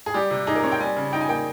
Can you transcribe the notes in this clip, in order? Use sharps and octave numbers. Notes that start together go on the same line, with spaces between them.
G#4
G3 G4
C3
D#4 G#4
A#4
C4 C#5
G5
G3 G#5
C#3
D#4 G5
G#5
A#3 G5